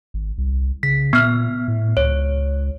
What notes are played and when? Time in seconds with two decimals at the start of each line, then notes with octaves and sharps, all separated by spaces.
0.14 G#1
0.38 C2
0.83 C#3 B6
1.13 A#2 B3 F6
1.68 A2
1.97 C#2 C#5